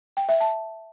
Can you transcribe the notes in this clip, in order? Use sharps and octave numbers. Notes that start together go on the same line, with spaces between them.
G5
E5
A5